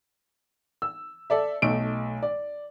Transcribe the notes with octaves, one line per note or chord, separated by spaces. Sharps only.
E6
A4 D5 E5
B1 A3 D#4 D7
D5